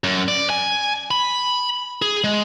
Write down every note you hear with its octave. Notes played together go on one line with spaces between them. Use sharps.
F#2
D5
G#5
B5
G#4
G#3